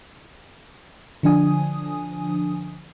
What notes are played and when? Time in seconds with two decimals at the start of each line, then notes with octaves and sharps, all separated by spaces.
1.23 D3 F3 D4 G#5 D#6